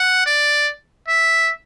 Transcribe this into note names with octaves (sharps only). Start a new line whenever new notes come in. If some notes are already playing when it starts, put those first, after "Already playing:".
Already playing: F#5
D5
E5